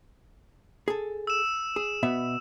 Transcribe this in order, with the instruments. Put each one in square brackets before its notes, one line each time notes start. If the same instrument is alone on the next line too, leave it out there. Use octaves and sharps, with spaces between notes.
[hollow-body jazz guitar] G#4 A4
[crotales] E6 E7
[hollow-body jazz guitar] G#4
B2 B3 E5